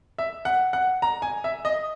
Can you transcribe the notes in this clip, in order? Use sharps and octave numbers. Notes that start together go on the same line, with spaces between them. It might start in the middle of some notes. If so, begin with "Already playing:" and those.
E5
F#5
F#5
A#5
G#5
E5
D#5